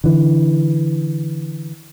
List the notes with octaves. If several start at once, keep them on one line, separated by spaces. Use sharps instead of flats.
D3 E3